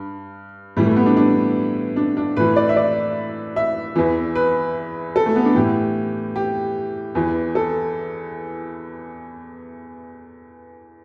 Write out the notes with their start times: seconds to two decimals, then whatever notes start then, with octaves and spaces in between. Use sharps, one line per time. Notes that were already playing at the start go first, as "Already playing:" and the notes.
Already playing: G2
0.77 A2 E3 G3
0.86 A3
0.96 B3
1.06 D4
1.17 D4
1.96 D4
2.17 D4
2.37 A2 E3 B4
2.56 D5
2.69 E5
2.76 D5
3.56 E5
3.96 E2 E3
4.35 B4
5.16 A4
5.26 A3
5.36 B3
5.45 D4
5.55 A2 E3 G4
6.36 G4
7.15 E2 E3
7.55 A4